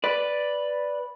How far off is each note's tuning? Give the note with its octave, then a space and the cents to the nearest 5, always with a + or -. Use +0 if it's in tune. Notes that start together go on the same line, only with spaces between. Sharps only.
B4 +0 D5 +0